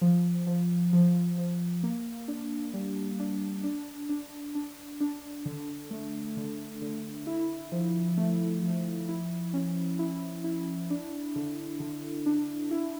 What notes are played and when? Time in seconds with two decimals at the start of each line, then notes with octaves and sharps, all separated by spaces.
0.01 F3
0.47 F3
0.93 F3
1.38 F3
1.83 A#3
2.28 D4
2.73 G3
3.20 D4
3.64 D4
4.09 D4
4.55 D4
5.01 D4
5.46 D3
5.91 A3
6.37 D3
6.82 D3
7.27 E4
7.72 F3
8.18 A3
8.63 F3
9.09 E4
9.54 C#4
9.99 E4
10.44 E4
10.90 D4
11.36 D3
11.80 D3
12.26 D4
12.71 E4